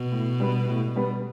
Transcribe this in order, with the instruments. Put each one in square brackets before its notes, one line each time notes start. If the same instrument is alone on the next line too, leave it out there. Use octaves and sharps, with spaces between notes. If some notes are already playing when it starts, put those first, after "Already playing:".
Already playing: [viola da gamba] B2
[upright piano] A2
G3 B3
A2
G3 B3